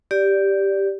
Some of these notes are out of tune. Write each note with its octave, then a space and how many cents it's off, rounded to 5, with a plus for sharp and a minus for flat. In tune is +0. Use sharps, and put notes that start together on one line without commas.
G4 +0 D5 -10